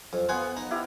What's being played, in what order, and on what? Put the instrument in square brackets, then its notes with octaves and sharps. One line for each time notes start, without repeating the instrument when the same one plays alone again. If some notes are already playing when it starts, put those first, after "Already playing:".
[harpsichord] F2
[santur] B3 F#5 [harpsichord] F4 G#5
[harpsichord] D#4
[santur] E4 G4 F5